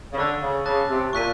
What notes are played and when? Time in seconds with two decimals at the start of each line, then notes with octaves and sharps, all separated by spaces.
0.13 C#3
0.18 D3 C#6 E6 A6
0.42 C#3
0.65 C#3 A5 D6 F#6 A6
0.89 C3
1.13 A#2 C#6 F#6 B6 D#7